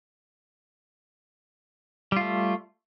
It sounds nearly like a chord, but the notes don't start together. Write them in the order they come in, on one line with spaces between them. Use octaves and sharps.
G3 F4 A3